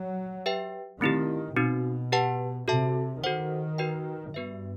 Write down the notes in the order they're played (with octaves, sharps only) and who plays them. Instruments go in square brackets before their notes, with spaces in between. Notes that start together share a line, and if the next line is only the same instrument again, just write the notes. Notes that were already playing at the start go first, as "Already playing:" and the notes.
Already playing: [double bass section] F#3
[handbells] G4 B4 E5 G5
[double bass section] D#3 [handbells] A3 C4 E4 G4
[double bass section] B2 [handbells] C4 D#4 F#4
[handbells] G4 B4 F#5 A5
[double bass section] C3 [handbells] F#4 A4 E5 A5
[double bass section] D#3 [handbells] F#4 A4 C5 F#5
[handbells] F#4 B4 D#5 G5
[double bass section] G2 [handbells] B3 F#4 B4 E5